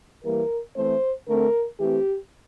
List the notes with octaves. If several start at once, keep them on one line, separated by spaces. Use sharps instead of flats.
E3 G3 A#3 A#4
E3 A3 C4 C5
D3 A3 C4 A#4
E3 A3 C4 G4